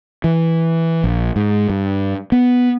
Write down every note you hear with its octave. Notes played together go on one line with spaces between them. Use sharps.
E3
A#1
G#2
G2
B3